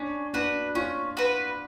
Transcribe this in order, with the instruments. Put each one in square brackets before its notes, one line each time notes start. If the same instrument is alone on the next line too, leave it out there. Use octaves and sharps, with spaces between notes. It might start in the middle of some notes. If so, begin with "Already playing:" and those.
Already playing: [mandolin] C#4 [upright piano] D4
[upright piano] D4 [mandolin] F#4 B4
[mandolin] C#4 [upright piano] F4
[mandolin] F#4 B4